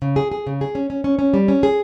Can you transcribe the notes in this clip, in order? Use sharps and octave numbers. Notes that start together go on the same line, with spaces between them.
C#3
G#4
G#4
C#3
G#4
C#4
C#4
C#4
C#4
G3
C#4
G#4